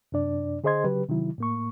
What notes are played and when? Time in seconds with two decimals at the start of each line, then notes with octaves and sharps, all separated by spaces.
0.12 F#2 C3 D4 D5
0.64 D3 G#4 C5 D#5 C6 G#6
0.84 C#3 F#3 G4 B4
1.09 C3 D#3 F#3 E4
1.38 A2 A#3 C#6